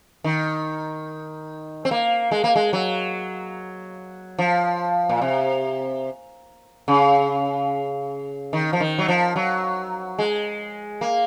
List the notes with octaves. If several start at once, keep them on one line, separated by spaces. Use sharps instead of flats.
D#3
C4
A#3
G#3
A#3
G#3
F#3
F3
A#2
C3
C#3
D#3
F3
D#3
F#3
F3
F#3
G#3
A#3